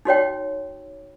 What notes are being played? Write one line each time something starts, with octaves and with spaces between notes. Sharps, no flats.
D#4 F#4 C#5 G5